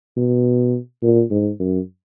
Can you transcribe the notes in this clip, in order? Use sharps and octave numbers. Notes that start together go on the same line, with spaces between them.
B2
A#2
G#2
F#2